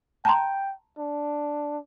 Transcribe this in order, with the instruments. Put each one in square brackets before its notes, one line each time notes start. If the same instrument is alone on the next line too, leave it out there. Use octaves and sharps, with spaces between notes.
[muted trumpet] G5 [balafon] A5 A#5 C6
[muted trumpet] D4